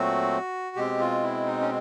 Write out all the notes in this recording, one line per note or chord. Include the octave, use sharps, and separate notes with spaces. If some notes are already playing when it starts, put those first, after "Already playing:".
Already playing: A#2 F#3 A3 C4 F#4
B2 G#3 C4 G4
F4
E4
D#4
C#4